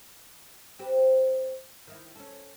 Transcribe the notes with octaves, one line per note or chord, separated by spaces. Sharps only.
C4 G4 B4
D#3 D#4 E4
C#4 A4